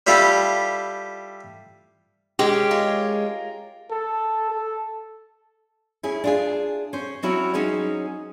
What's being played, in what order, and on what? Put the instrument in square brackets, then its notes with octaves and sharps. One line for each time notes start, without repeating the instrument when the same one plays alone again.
[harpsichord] G3 E4 F4 G4 A4
[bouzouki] G#3 C#4 [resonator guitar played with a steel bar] G4
[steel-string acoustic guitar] F4 A#4
[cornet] A4
A4
[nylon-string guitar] C#4 E4 G#4
D4 F4 G#4
C#4 C5
F#3 C4 C#4 E4 F#4 C#5
F#3 C#4 D#4 G#4 C5